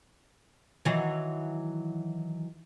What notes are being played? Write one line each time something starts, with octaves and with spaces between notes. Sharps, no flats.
D#3 E3 F#3